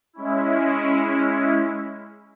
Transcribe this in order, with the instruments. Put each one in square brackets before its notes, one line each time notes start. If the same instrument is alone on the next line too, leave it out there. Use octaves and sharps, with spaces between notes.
[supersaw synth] G#3 C#4 E4